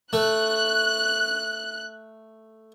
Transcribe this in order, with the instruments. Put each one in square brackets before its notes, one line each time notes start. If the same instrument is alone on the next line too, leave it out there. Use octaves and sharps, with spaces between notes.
[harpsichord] A3 [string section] F#6